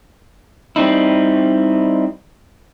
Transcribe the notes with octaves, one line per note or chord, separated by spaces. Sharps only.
G3 C4 D#4 E4